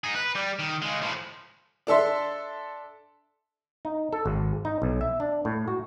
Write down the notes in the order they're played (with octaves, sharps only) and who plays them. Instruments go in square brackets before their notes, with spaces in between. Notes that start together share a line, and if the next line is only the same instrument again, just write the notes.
[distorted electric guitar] D#4 G#4
B4
G3
D#3
C#3 G#3
A2 F3
[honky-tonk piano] D4 A4 E5 C6
[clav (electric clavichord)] D#4
A4
G#1
D#4
B1
E5
D4
A2
F#4